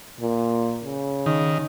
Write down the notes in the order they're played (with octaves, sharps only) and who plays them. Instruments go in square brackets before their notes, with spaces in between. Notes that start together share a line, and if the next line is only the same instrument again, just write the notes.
[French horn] A#2
C#3
[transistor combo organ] D#3